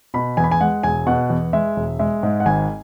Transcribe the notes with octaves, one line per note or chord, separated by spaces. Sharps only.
B2 B5
E2 G#5
B5
G#5
G#3 F#5
E1 G#5
B2 F#5
E2
G#3 E5
E1
G#3 E5
G#2
F#5
G#1 G#5